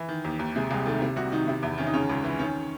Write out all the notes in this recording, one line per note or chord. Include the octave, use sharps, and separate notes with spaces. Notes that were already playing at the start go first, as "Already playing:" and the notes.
Already playing: E3
D#3
D#2
D#2
C3 G#3
C2 G#3
D#3 A3
C3 E4
C2 F#4
D#3 D#4
C3 E4
E2 E4
D#3 C#4
D#4
C#3 C#4
C#2
E3
D#3 C#4